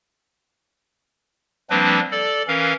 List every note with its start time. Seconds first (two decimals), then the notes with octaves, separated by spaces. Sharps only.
1.70 F3 G3 A#3 C4 D4 B4
2.12 A4 D5
2.48 E3 C#4 A#4 F5